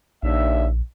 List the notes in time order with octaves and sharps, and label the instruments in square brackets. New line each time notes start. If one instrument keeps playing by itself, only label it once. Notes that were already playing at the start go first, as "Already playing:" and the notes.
[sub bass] A#1 [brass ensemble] D#2 D4 E5